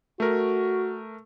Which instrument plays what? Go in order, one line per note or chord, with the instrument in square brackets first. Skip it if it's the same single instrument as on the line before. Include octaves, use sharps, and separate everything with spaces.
[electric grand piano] A3 A#4 [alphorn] F#4